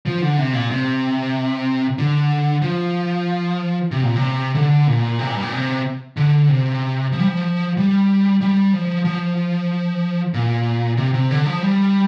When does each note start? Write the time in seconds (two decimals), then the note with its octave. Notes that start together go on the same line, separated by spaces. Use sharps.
0.06 F3
0.22 D3
0.38 C3
0.53 A#2
0.70 C3
1.98 D3
2.62 F3
3.91 C3
4.03 A#2
4.15 C3
4.55 D3
4.87 A#2
5.19 C3
5.27 A#2
5.35 G2
5.42 A#2
5.52 C3
6.17 D3
6.49 C3
7.12 F3
7.20 G3
7.27 F3
7.77 G3
8.41 G3
8.74 F3
9.05 F3
10.34 A#2
10.97 C3
11.14 C3
11.31 D3
11.46 F3
11.62 G3